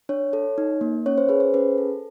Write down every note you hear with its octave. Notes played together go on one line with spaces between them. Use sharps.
D4 C#5
A4
D#4
A#3
C#4 C#5
C5
G#4 B4
C5
C#4 B4
A4